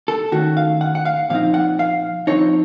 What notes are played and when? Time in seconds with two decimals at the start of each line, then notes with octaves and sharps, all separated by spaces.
0.08 A4
0.32 D#3 A3 C#4 F#4
0.57 F5
0.81 F#5
0.95 F#5
1.05 F5
1.30 A#2 F3 C4 D#4 F5
1.54 F#5
1.79 F5
2.27 F3 C4 D#4 C#5